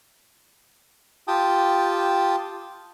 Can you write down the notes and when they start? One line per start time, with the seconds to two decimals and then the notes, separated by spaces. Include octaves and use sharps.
1.28 F4 G4 G5 A5 D#6